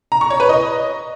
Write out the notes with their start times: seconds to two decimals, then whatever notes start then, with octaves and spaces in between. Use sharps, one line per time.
0.12 A#5
0.21 C#6
0.30 C#5
0.40 B4
0.49 D#5